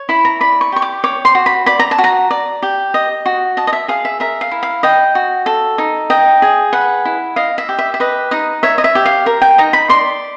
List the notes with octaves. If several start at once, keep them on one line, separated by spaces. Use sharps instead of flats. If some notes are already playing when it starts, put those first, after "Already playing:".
Already playing: C#5
E4 B5
A#5
D5 B5
C#6
G4 C#6
D6
C#5 D6
C6
F#4
B5
D5 B5
A#5
A5
F#4
A#5
D5
G4
D#5
F#4
D#5 A5
D#5
E5
G#4 F5
E5
A#4 E5
F5
E4
F5
D#5 G5
F#4
A4
D#4
D#5 G5
G#4
B4 F#5
E4
D#5 F5
E5
G4
E5
E5
B4 D#5
D#4 D#5
C#5 E5
D#5
E5
G4
F5
A#4
G5
D#4 A#5
B5
D5 C6